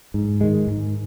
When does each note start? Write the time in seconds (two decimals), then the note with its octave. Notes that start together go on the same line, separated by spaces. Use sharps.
0.14 G#2
0.41 D#3 G#3
0.67 G#2